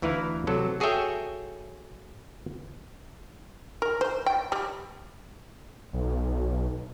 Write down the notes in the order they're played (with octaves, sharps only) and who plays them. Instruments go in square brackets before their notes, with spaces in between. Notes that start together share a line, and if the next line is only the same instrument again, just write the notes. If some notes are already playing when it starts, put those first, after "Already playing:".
[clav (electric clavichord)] D2 E3 E4 B4 F5 A#5
C3 F#3 A4
F#4 G#4 A4 C#5 E5 G5
[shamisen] A#4
C5
G5
G3
[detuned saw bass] B1